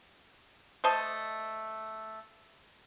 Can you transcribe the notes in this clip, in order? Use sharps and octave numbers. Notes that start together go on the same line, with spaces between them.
A3 C5 D#5 A5